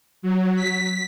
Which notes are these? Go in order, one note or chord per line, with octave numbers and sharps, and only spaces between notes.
F#3
B6